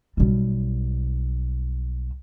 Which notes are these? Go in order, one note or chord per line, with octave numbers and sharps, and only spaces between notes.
B1 G3